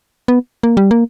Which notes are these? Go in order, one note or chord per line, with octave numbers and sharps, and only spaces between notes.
B3
A#3
G3
A#3